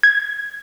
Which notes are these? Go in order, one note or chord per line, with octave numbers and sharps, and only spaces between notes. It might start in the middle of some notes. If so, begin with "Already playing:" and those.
G#6